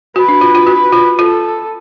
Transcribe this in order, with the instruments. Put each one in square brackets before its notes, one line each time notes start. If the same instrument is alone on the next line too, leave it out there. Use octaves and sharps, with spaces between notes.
[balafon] F#4 [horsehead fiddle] B4
[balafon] D4
F4
F4
F#4
F4
[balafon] F4 [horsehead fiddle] A4